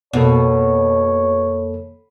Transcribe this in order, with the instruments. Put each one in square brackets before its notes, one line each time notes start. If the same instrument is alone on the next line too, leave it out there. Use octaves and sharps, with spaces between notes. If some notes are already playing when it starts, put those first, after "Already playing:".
[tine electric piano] F2 A#3 A4 [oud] B2 [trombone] C#5